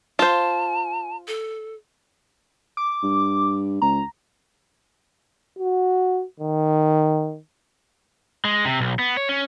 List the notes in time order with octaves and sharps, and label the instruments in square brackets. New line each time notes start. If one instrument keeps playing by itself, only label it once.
[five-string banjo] F4 C5 [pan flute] A5
[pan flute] A4
[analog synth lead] D6
[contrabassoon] G2
[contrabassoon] C#2 [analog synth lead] A#5
[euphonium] F#4
D#3
[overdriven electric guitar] G#3
C3
B1
B3
C#5
C#4